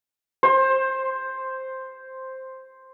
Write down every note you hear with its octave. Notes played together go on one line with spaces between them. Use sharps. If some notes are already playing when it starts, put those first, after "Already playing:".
C5 C6